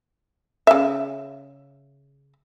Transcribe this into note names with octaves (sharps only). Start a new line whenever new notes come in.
C#3 E5